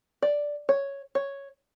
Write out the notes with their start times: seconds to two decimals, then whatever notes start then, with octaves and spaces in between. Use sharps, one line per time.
0.22 D5
0.69 C#5
1.15 C#5